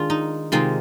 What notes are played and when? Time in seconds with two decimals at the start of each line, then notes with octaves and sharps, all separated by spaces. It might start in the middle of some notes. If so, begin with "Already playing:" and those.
Already playing: D#3 G#3 D4 F4
0.10 D#4
0.52 C3 D#3 G#3 C4 D#4 F4